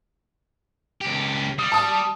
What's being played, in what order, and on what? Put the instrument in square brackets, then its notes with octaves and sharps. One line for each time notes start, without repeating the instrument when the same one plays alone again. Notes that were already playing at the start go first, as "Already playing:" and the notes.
[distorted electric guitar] C#2 G4
[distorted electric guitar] G3 [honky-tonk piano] D#6
[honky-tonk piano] A5 D#6